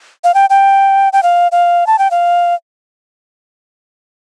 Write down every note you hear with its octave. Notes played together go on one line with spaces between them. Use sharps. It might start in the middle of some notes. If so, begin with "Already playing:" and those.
F5
G5
G5
G5
F5
F5
A5
G5
F5